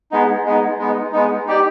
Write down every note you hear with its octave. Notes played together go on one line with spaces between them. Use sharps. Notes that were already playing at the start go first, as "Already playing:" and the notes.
G#3 B3 D#4
G#3 B3 D#4
G#3 B3 D#4
G#3 B3 D#4
D#4 G4 D5 G5